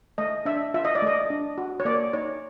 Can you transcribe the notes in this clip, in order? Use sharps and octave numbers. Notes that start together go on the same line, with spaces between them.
A3 D#5
D4 E5
F4 E5
D#5
D5
A3 D#5
D4
F#4
C#5
A#3 D5
D#4 C#5